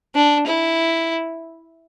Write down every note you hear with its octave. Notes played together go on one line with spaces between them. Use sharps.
D4
E4